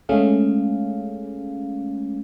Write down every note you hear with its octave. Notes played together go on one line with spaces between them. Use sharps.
G#3 A3 C#4 G#4 F5